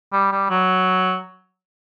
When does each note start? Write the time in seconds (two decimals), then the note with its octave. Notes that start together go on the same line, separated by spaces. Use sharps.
0.13 G3
0.32 G3
0.50 F#3